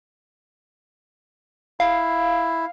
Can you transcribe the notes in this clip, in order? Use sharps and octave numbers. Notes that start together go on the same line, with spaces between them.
E4 F5